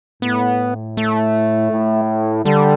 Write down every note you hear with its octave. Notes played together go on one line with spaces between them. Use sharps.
A2 B3
A3
A2
D3 G3